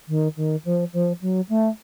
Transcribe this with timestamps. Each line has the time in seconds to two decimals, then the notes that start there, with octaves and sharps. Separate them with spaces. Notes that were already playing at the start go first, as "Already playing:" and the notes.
0.08 D#3
0.36 D#3
0.64 F3
0.92 F3
1.21 F#3
1.49 A3